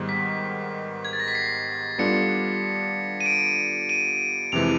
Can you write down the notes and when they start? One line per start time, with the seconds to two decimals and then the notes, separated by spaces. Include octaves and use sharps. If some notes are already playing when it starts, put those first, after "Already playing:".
Already playing: G#2 D#3 G3 B3
0.09 B6
1.05 G#6
1.13 A6
1.20 A#6
1.28 B6
1.35 C7
1.98 G3 B3 D4 F4 A4 C#7
3.21 D#7
3.26 D7
3.89 D#7
4.52 F2 C3 E3 G#3 F7